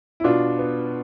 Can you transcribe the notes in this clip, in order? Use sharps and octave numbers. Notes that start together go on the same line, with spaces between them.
E4
B2 D4 F4
B3